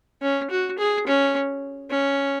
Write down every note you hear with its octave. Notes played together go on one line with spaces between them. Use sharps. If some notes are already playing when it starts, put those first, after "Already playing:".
C#4
F#4
G#4
C#4
C#4